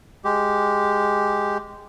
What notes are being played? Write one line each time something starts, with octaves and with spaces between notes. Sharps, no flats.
G#3 G4